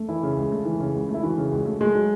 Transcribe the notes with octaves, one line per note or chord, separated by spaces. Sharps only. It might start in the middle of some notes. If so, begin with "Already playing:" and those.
Already playing: A3
E3 E4
C#3
C#2
A3
E3
C#3
C#2
A3
E4
E3 F#4
C#3
C#2
A3
G#3 A3
F#3